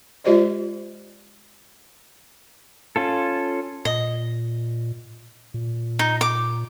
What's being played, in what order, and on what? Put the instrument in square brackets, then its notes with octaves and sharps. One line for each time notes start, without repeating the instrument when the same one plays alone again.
[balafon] G#3 F4 G4 C5 D5 D#5
[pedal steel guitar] C#4 F4 A4
[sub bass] A#2 [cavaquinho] D#5
[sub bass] A#2
[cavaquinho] D#4
D6